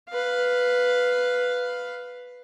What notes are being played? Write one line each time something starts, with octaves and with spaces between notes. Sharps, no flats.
B4 F5